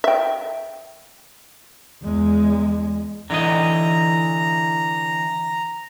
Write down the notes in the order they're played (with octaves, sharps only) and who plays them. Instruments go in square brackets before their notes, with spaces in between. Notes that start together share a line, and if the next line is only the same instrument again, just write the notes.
[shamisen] E5 G5
[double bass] E2 G#3
[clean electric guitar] D3 E3 D#5 [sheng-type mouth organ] A#5